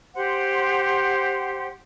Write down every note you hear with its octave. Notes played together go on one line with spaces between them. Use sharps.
G4 C5 F#5 C6